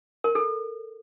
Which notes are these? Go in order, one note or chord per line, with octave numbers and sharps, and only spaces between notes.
A#4
A4